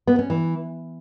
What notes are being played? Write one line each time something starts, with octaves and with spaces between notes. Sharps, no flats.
B3
C#4
E3